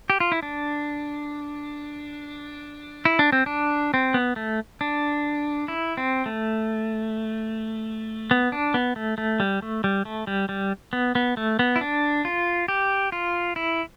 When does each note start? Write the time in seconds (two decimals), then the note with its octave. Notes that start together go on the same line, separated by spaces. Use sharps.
0.10 G4
0.20 F4
0.32 E4
0.43 D4
3.05 E4
3.19 D4
3.32 C4
3.46 D4
3.94 C4
4.14 B3
4.36 A3
4.81 D4
5.68 E4
5.97 C4
6.26 A3
8.31 B3
8.52 D4
8.74 B3
8.96 A3
9.18 A3
9.40 G3
9.62 A3
9.84 G3
10.05 A3
10.27 G3
10.49 G3
10.93 B3
11.15 B3
11.37 A3
11.59 B3
11.76 E4
11.81 D4
12.25 F4
12.68 G4
13.12 F4
13.56 E4